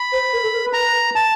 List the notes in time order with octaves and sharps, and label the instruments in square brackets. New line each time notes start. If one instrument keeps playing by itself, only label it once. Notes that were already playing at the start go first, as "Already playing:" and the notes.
Already playing: [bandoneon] B5
[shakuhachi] C5
A#4
A4
A#4
B4
[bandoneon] A#5
A5